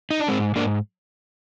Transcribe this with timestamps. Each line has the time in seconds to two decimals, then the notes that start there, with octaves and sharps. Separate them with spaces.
0.11 D#4
0.20 D4
0.28 G#2 G#3 C4
0.56 G#2 A#3 D4